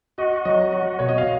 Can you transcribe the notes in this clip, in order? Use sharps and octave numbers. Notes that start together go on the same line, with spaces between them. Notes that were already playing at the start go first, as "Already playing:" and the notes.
F#4 D#5
F#3 D#5
F#4
B2 C#5
D#5
F5